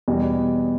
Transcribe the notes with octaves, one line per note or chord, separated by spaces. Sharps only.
E2 B2 G3